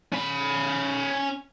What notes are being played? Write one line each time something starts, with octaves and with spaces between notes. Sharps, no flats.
C#4 B5